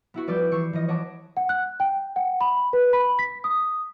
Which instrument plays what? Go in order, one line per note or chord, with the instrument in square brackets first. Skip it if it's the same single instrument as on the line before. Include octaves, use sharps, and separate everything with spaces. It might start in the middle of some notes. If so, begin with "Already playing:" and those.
[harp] B3 E4 F#4
F3 G3 B4 D5 E6 G6
E3 C#6 E6 C7
E3 F3 D#5
C#5 D#5 F#5 A5 B5 D6
[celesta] F#5
F#6
G5
F#5
B5
B4
B5
B6
D#6